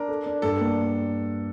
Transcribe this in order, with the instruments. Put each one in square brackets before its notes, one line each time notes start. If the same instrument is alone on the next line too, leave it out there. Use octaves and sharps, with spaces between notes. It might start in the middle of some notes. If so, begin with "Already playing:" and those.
Already playing: [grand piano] D4 [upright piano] A#4
[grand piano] A4
D4
[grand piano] G2 [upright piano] A4
[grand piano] A#3